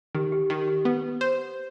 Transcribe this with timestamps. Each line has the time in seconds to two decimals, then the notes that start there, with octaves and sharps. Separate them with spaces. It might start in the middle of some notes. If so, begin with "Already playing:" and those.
0.15 D#3 G4
0.32 G4
0.50 D#3 G4
0.68 G4
0.85 B3 B4
1.21 C5